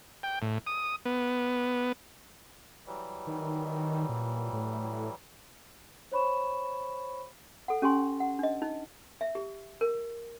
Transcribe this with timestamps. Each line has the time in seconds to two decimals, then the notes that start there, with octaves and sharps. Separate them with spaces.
0.23 G5
0.42 A2
0.67 D#6
1.05 B3
2.87 E3 F#3 G3
3.27 D#3
4.09 A#2
4.53 A2
6.12 C5 C#5 B5 C#6 E7
7.68 A4 F#5
7.82 C#4 G4 G#5 C6
8.20 F#5
8.39 D4 D#5
8.62 D#4
9.21 E5
9.35 G4
9.81 A#4